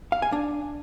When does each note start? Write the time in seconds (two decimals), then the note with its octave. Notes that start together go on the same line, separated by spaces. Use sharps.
0.12 F5
0.22 G#5
0.32 D4